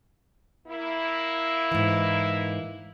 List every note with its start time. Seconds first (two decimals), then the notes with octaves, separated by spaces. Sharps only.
0.67 A#3 E4
1.71 G#2 E3